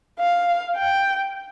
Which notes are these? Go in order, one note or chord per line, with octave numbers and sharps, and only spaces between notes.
F5
G5